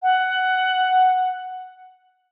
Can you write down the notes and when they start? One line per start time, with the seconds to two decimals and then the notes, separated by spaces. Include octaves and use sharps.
0.02 F#5